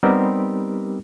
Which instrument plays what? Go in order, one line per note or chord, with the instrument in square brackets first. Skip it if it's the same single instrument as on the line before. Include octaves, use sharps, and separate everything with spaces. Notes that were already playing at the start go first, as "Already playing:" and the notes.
[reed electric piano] G3 B3 C4 D#4 G4 A#4